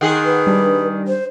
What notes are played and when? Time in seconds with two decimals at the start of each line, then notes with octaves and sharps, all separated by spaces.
0.01 D#3 G#4 F#5 C6 F#6
0.25 B4
0.47 G3 D4
1.08 C5